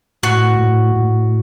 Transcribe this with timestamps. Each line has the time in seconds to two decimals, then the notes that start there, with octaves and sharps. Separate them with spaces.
0.23 A2 F#4
0.59 A2
0.96 A2